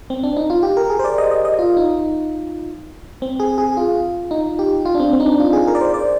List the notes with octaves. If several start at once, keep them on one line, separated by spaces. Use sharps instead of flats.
C4
D4
D#4
F4
G4
A#4
G#4
C5
D5
D#5
D#5
D#5
F4
D#4
C4
G#4
G#4
F4
D#4
G4
F4
D4
C4
C4
D#4
D4
F4
G#4
A#4
D5
C5
D5